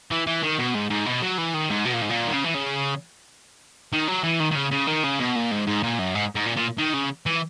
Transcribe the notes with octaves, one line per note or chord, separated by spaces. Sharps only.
E3
E3
D#3
B2
G#2
G#2
B2
F#3
E3
D#3
G#2
B2
A#2
G#2
A#2
D#3
C#3
E3
C#3
D#3
F#3
E3
D#3
D#3
C#3
C#3
D#3
C#3
B2
A#2
G#2
G#2
A#2
F#2
G#2
G#2
A#2
A#2
D#3
C#3
E3